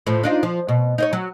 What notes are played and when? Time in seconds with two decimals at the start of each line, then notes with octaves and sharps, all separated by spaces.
0.07 A2 F3
0.24 D4 D#4 F4
0.43 F3
0.69 B2
0.98 D#4 C5 C#5
1.13 F#3